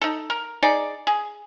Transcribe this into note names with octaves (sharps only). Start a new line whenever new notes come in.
D#4 A4
A#4
D#4 G#4 D5
G#4